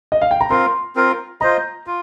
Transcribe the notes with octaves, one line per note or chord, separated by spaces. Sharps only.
D#5
F5
G5
A#5
C4 F4 A#4 F5 C6
C4 F4 A#4 F5
F4 C5 D#5 A#5
F4